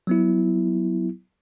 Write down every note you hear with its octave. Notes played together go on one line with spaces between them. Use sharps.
F#3 B3 E4